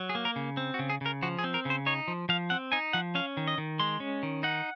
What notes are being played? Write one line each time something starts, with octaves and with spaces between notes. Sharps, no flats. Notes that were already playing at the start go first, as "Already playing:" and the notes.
Already playing: F#3
G#4
A#3
A#4
C#3
C4
F#4
C#3
G#4
C#3 A#4
F3 F#4
G#4
C4
A#4
C#3 C5
D#4 C#5
F3
F3 F5
C4 F#5
D#4 G#5
F3 F#5
C#4 F5
D#3
D#5
D#3
G#3 C6
C#4
D#3
D#4 F#5